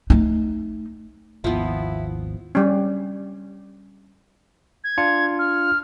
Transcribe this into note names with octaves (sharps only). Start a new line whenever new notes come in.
A3 D#4
G#1 D#2 F3 B3 E4
G3 C#4
G#6
D4 F4 C#7
F6